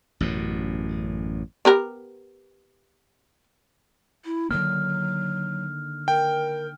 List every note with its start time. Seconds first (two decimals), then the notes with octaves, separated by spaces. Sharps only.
0.20 A1 F#2 B2
1.65 B3 G4 A#4
4.25 E4
4.51 D3 D#3 F#3 A#3 F6
6.08 A#4 G5